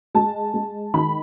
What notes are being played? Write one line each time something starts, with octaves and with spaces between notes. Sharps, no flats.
G#3 A5
G#3
D#3 B5